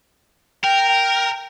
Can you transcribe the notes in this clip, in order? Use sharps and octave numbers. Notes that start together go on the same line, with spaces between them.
A#4 G5
G5